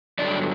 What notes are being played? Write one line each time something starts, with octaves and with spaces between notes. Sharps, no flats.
G2 D3 F#3 D5